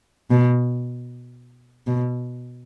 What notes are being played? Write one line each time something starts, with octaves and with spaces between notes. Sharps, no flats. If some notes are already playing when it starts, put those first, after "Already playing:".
B2
B2